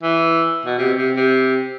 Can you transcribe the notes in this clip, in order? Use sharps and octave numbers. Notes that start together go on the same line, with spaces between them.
E3
B2
C3
C3
C3